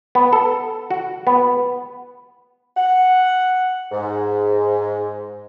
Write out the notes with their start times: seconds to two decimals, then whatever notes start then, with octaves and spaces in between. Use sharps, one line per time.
0.15 B3
0.33 A4
0.91 F#4
1.27 B3
2.77 F#5
3.92 G#2